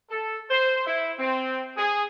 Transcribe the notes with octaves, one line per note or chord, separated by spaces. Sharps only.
A4
C5
E4
C4
G#4